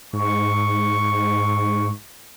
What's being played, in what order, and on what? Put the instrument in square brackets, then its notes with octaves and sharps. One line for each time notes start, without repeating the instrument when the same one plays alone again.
[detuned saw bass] G#2 [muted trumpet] C#6